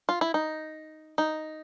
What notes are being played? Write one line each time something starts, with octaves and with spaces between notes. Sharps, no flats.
F4
E4
D#4
D#4